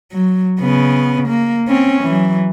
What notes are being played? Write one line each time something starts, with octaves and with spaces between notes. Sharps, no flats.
F#3
C#3 B3
A#3
C4 C#4
E3 F#3